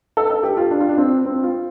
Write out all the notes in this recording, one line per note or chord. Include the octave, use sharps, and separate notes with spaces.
A4
A4
G4
F4
D4
F4
D4
C4
C4
F4